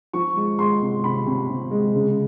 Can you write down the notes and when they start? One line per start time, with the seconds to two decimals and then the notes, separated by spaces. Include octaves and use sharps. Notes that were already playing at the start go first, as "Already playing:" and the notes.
0.13 F3 C#6
0.36 G#3
0.59 G#3 C6
0.81 C3
1.04 C3 B5
1.26 C3
1.49 C3
1.71 G#3
1.94 C#3